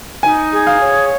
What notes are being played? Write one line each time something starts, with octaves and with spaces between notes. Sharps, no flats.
D#4 G#5
G#4
F5
C#5